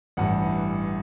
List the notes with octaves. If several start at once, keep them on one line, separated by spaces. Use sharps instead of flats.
A1 G2 E3 F#5